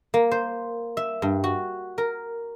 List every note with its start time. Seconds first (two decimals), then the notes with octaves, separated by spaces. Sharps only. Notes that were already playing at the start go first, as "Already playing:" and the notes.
0.14 A#3
0.31 C5
0.97 E5
1.22 G2
1.44 F#4
1.98 A#4